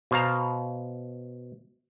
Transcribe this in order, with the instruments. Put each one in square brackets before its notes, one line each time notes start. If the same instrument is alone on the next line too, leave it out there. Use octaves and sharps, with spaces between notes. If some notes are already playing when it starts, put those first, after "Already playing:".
[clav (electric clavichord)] B2 C5 F5 A#5